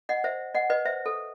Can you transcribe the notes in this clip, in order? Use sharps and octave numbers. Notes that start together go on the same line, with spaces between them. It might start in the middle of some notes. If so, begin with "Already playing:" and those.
D#5 F#5
C5 E5
D#5 F#5
B4 D#5
C5 E5
A4